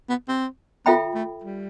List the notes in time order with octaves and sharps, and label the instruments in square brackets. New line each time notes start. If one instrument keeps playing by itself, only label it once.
[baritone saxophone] B3
C4
[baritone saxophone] B3 [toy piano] F4 A4 E5 G5 B5
[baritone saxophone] A3
G3